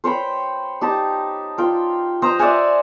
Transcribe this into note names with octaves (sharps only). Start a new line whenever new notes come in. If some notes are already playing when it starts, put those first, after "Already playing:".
C5 C#5 G5 B5
D#4 G4 A5
F4 G5
C5 D#5 G5 A#5
D5 E5 F#5 G#5